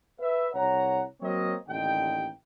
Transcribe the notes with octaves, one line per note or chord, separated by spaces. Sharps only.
B4 E5
C2 C#5 F#5 A#5
F#3 A#3 C4 A#4 C#5 D#5
A1 D#2 D3 D#4 G5